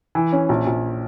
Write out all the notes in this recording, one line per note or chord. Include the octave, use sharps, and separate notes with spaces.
E3
C#4
A#1
A#1